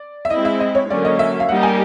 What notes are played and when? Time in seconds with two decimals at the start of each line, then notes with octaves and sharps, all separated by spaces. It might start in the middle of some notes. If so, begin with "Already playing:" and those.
Already playing: D5
0.25 E5
0.30 G#3 C4 E4 D#5
0.45 E5
0.60 D#5
0.75 C#5
0.89 D3 F#3 A#3 C#4 D5
1.05 D#5
1.19 E5
1.40 F5
1.48 G3 A#3 D#4 G4 F#5
1.63 G#5